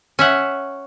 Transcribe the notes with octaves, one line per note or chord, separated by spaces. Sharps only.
C#4 E5 F#5